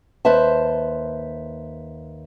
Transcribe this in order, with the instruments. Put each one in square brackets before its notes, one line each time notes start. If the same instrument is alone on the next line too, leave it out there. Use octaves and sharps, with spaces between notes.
[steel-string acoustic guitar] D#2 B4 C5 E5 A5